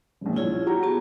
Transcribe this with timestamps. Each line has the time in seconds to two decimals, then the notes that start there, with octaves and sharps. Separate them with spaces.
0.21 E1 A#1
0.36 E4 F4 G#4 C#5
0.66 F#4 G4 A#5
0.83 B3 A5